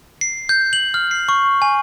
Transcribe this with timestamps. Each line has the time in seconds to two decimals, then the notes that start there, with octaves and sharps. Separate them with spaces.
0.21 C7
0.49 G6
0.73 F#7
0.94 F6
1.11 C7
1.29 C#6
1.62 G#5